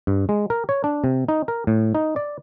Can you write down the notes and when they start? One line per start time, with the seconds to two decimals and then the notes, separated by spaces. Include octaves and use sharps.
0.07 G2
0.29 G#3
0.50 A#4
0.69 C#5
0.84 D4
1.04 C3
1.29 D#4
1.48 A#4
1.67 A2
1.95 D#4
2.16 D5